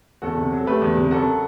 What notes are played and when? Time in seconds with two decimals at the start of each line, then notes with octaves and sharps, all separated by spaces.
0.22 E2 F#4 A4
0.37 C3
0.52 F#3
0.60 A4
0.66 A3 G4 B4
0.82 E2
0.97 C3
1.11 F#1 F#4 A4